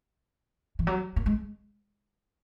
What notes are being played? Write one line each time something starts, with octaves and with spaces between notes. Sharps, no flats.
E3
F#3
A#3
G#3